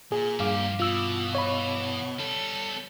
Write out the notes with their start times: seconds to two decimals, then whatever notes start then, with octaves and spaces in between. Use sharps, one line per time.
0.12 A#2 G#4
0.39 G2 F3 G4 F5 D6
0.80 B2 E3 F4 E6
1.35 C#5 B5
2.20 G3 B3 A4